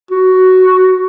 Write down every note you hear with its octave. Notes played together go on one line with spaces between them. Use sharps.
F#4